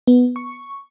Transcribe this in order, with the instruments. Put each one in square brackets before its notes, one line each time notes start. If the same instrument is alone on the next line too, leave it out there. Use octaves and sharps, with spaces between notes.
[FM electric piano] B3
C#6